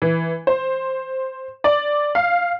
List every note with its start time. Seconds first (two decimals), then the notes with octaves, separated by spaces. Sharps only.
0.02 E3
0.47 C5
1.64 D5
2.15 F5